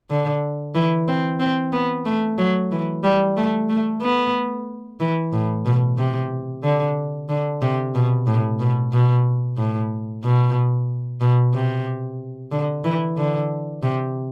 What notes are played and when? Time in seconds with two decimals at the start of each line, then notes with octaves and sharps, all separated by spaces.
0.10 D3
0.75 E3
1.08 C4
1.40 C4
1.72 B3
2.05 A3
2.38 F#3
2.72 E3
3.03 G3
3.37 A3
3.69 A3
4.02 B3
5.00 E3
5.32 A2
5.66 B2
5.98 C3
6.63 D3
7.29 D3
7.62 C3
7.95 B2
8.27 A2
8.59 B2
8.93 B2
9.57 A2
10.24 B2
11.21 B2
11.54 C3
12.52 D3
12.84 E3
13.17 D3
13.83 C3